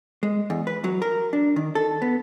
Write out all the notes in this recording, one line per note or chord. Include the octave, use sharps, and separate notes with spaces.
G#3
E2
B4
F#3
A#4
D4
D#3
A4
B3